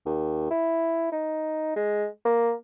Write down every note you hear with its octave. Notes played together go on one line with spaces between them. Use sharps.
D#2
E4
D#4
G#3
A#3